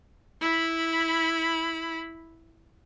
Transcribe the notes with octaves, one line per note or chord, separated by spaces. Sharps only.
E4 B5